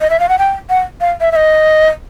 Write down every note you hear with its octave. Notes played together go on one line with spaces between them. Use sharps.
D#5
E5
F5
F#5
G5
F#5
F5
E5
E5
D#5